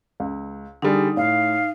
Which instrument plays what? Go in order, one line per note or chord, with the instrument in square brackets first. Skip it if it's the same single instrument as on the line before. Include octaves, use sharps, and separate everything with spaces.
[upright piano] C#2
[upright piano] D3 G3 G#4 [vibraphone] D#4
[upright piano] A2 [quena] F5